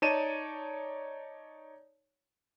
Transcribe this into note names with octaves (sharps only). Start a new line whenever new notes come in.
D#4 C#5 D5 A5 D#7 E7